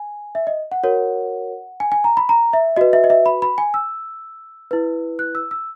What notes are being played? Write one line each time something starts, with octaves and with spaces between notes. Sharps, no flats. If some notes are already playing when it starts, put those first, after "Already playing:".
Already playing: G#5
E5
D#5
F#5
F#4 A#4 C#5
G#5
G#5
A#5
B5
A#5
E5
F#4 B4 D#5
E5
D#5
E5
B5
B5
G#5
E6
E4 B4
F#6
E6
E6